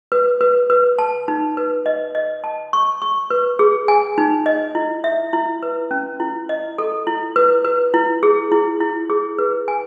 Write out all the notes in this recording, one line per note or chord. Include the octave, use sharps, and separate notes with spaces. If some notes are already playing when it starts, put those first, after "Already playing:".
B4
B4
B4
A5
D#4
B4
D#5
D#5
A5
C#6
C#6
B4
G#4
G#5
D#4
D#5
E4
E5
E4
B4
C#4
E4
D#5
A4
E4
B4
B4
E4
G#4
E4
E4
G#4
B4
G#5